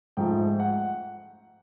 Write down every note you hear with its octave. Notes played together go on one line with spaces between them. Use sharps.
G#2 F3 A3 G5
F#5